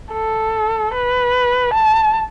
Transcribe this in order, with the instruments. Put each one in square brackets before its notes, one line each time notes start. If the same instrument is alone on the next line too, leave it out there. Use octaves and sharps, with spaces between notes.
[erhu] A4
B4
A5